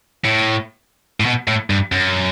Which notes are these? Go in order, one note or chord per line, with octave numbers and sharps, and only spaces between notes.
A2
A2
B2
A2
G2
F#2